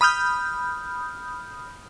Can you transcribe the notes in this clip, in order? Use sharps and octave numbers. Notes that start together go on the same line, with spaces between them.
B5 D#6 F6 G6